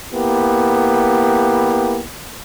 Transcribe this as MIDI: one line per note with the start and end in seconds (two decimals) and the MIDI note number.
0.12 2.01 58
0.12 2.01 59
0.12 2.01 64
0.12 2.01 67